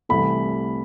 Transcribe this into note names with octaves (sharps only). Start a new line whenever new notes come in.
C2 C3 E3 A3 B5